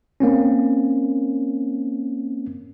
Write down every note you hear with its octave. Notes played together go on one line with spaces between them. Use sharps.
A#3 C4 C#4